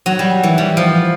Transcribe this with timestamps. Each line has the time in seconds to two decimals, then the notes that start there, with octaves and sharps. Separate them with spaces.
0.06 F#3
0.19 G3
0.43 E3
0.58 G3
0.77 F3